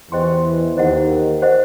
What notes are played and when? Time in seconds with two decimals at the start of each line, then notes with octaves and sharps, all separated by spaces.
0.11 E2 E3 G4 C5 D#5 G5 C6
0.77 D#2 D#3 C5 D#5 F#5
1.42 C5 D#5 F#5